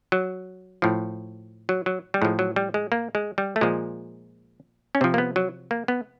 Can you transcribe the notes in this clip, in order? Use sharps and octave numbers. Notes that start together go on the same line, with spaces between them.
F#3
A2 F3
F#3
F#3
G3
A2 F3 G#3
F#3
G3
G#3
A#3
G#3
G3
A3
A#2 F3 G#3
C#4
C3 F3 C4
A#3
B3
F#3
A#3
B3